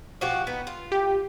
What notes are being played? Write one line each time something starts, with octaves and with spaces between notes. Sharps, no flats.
F3 F#4 G4
B3 D#4
F4
G4